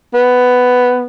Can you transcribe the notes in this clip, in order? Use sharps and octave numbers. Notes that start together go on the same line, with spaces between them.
B3